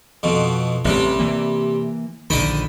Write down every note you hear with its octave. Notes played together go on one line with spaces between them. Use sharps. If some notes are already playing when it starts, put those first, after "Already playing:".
F2 B2
A1 C3 G3
E3 A#3
A#1 D3 D#3 D5 D#5 B5